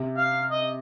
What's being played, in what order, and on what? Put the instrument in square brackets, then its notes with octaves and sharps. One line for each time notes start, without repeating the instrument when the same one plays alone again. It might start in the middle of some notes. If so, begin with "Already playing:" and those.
Already playing: [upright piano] C3
[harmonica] F5
D#5